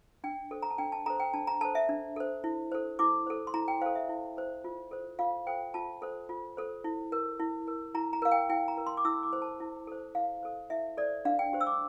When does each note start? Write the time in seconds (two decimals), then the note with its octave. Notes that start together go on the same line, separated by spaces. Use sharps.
0.24 D4 G5
0.51 A4 C5
0.62 A#5
0.70 A5
0.78 D4 G5
0.92 A5
1.06 A4 C5 A#5
1.20 G5
1.34 D4 A5
1.47 A#5
1.61 A4 C5 A5
1.75 E5
1.89 D4
2.16 A4 C5
2.44 E4
2.72 A4 C5
2.99 E4 D6
3.27 A4 C5
3.47 C6
3.54 E4 A#5
3.68 G5
3.81 C5 F5
3.86 A4
3.95 E5
4.09 E4
4.36 A4 C5
4.64 F4
4.91 A4 C5
5.19 F4 F5
5.47 A4 C5 G5
5.74 F4 A5
6.02 A4 C5
6.29 F4
6.57 A4 C5
6.84 E4
7.12 A#4
7.40 E4
7.67 A#4
7.95 E4 A#5
8.13 A#5
8.22 A#4 F5
8.31 G5
8.49 E4 G5
8.68 A#5
8.77 A#4
8.87 C6
8.97 D6
9.05 E4 E6
9.23 D6
9.33 A4 C5
9.42 A5
9.60 E4
9.87 A4 C5
10.15 E4 F5
10.43 A4 C5
10.70 E4 E5
10.97 A4 C5 D5
11.25 D4 F5
11.39 G5
11.53 G4 C5
11.61 E6
11.67 D6